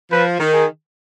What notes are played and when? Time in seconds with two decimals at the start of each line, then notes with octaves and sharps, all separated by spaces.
0.11 F3 B4
0.40 D#3
0.53 G#4